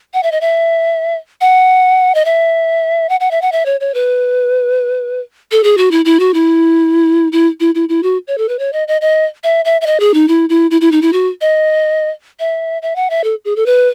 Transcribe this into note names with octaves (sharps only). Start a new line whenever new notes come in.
F#5
E5
D#5
E5
F#5
D#5
E5
F#5
F#5
E5
F#5
E5
C#5
C#5
B4
A4
G#4
F#4
E4
E4
F#4
E4
E4
E4
E4
E4
F#4
C#5
A4
B4
C#5
D#5
D#5
D#5
E5
E5
E5
D#5
G#4
D#4
E4
E4
E4
E4
D#4
E4
F#4
D#5
E5
E5
F#5
E5
A4
G#4
A4
B4